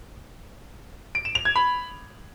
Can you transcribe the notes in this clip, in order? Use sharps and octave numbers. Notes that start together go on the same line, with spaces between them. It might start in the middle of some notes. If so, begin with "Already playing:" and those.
D7
E7
F7
G#6
B5